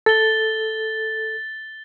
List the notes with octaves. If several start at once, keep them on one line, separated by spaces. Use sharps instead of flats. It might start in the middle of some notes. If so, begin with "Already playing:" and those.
A4 A6 G7